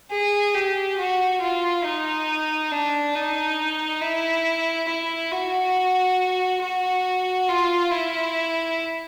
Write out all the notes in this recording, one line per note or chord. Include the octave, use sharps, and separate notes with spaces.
G#4
G4
F#4
F4
D#4
D4
D#4
E4
E4
F#4
F#4
F4
E4